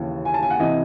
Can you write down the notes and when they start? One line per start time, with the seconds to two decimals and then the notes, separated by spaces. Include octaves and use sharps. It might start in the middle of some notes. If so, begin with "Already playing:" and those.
Already playing: D#2 C#3 E3 A5
0.25 G#5
0.34 A5
0.42 G#5
0.50 F#5
0.59 C3 E3 D#5